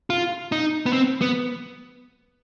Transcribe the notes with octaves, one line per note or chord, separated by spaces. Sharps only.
F4
D#4
B3
C4
B3